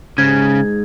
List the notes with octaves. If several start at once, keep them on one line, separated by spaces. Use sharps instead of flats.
G#2 C#3 G#6